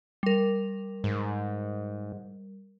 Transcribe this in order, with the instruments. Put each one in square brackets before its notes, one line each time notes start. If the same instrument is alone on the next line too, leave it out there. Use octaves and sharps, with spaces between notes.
[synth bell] G3 A#4
[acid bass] G#2